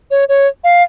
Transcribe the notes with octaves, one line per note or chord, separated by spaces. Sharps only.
C#5
C#5
F5